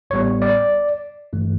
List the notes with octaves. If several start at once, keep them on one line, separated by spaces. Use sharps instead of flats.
A1 A2 G3 B3 C#5
D5
G1 G2 E3 A3